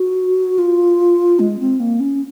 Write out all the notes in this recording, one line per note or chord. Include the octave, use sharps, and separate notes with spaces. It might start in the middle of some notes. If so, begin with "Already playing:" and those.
Already playing: F#4
F4
G#3
C4
A#3
C#4